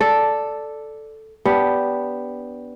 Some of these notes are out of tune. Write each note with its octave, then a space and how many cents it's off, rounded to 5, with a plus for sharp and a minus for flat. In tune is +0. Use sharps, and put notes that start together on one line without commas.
A4 +0 D5 +0
B3 +0 D4 -15 G4 +0